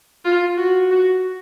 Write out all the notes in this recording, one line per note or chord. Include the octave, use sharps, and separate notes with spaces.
F4
F#4
F#4